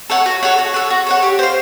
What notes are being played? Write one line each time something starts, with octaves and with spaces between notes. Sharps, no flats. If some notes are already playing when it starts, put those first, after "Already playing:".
A4 C#5 F#5
F#4
A4 C#5 F#5
F#4
A4 C#5 F#5
F#4
A4 C#5 F#5
G4
C5 F5